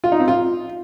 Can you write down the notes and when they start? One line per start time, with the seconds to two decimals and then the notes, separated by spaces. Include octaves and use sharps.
0.04 F4
0.12 D#4
0.20 C4
0.28 F4